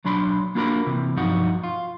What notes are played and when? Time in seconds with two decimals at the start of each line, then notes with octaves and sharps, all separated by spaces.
0.04 B1 F#3 D4 B5 C6
0.55 A#3 D4 F4 F#4 A#4 B5
0.87 C3 E3
1.16 B1 G2 F3 D#4 F#4
1.64 F4